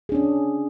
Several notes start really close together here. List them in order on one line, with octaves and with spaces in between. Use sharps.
G#4 D4 C#4